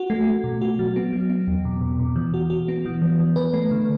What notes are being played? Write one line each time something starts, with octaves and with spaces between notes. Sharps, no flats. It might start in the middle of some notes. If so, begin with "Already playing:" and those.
Already playing: F#4
A3
A3
B2
F#4
F#3
B3
F#3
B3
E2
B2
B2
B2
E3
F#4
F#4
B3
E3
E3
E3
B4
A3
D3